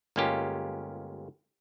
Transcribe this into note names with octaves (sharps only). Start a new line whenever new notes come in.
G1 G#3 A#3 C#4 F4 G4